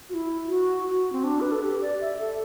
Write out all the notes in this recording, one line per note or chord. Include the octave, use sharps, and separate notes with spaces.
F#4
E4
F#4
F#4
C4
D4
B4
A4
G4
D5
E5
A4